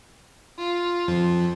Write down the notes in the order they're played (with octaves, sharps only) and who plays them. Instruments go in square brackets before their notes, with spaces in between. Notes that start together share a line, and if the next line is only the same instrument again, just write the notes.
[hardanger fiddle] F4
[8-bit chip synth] F2 F3